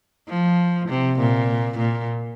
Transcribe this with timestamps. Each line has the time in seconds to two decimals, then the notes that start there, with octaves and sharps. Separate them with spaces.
0.28 F3
0.88 C3
1.19 A#2
1.78 A#2